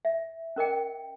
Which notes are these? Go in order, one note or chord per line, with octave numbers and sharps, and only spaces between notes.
E5
C#4 A#4 D#5 G5